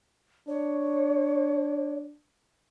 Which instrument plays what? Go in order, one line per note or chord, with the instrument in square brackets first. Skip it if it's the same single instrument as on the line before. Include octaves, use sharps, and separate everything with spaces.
[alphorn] D4 [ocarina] C#5